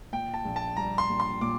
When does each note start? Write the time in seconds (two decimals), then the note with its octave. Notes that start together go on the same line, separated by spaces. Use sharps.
0.12 A#2 G5
0.34 A5
0.45 A#1
0.56 A5
0.76 G3 A#5
0.98 C6
1.09 A#1
1.20 C6
1.41 A#2 D6